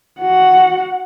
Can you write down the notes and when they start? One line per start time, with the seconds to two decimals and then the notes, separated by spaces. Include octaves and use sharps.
0.21 F#4 F#5